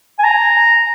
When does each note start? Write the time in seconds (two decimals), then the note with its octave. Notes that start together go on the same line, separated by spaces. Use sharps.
0.19 G#5
0.24 A#5